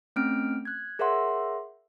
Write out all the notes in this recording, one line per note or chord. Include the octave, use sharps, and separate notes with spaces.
A3 C4 C#4 F6 D7
F#6 G#6
G#4 A#4 C#5 E5 F#5 C6